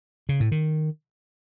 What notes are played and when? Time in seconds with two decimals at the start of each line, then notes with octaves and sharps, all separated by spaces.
0.29 C#3
0.40 A2
0.52 D#3